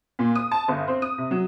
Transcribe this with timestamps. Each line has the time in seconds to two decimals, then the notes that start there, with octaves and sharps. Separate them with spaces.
0.19 A#2
0.35 D#6
0.51 A5
0.68 G1
0.88 C4
1.02 D#6
1.18 C3
1.31 F#3